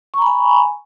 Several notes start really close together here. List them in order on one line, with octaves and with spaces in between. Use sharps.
C#6 A#5 B5 G#5